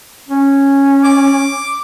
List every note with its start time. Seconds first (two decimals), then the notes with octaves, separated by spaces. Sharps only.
0.28 C#4
1.04 D6